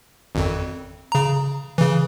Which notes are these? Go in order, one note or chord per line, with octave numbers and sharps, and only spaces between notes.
G#1 F2
C#3 A#5
C#3 E3